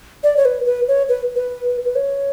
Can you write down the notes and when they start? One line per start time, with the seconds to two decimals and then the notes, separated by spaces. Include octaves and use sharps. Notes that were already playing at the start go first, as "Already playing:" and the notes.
0.23 D5
0.37 C#5
0.45 B4
0.66 B4
0.88 C#5
1.09 B4
1.35 B4
1.85 B4
1.95 C#5